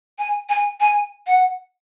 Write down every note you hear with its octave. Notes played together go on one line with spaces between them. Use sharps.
G#5
G#5
G#5
F#5